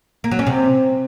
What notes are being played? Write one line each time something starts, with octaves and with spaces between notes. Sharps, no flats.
A#3
F#3
C#4
C3